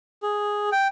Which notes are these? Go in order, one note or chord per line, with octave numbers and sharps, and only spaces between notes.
G#4
G5